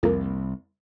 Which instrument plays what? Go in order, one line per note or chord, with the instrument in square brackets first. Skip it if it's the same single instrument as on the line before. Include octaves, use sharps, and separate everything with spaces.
[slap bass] C2 [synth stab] F2 A#3